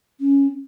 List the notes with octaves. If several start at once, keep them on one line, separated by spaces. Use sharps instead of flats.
C#4